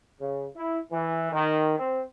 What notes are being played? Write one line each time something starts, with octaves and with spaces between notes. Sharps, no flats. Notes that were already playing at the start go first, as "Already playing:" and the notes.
C#3
E4
E3
D#3
C4